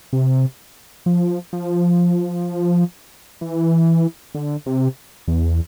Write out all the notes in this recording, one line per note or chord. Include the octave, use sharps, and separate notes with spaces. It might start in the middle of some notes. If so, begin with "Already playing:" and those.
C3
F3
F3
E3
D3
C3
E2